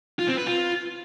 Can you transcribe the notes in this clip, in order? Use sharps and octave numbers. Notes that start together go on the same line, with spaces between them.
F4
C4
B4
F4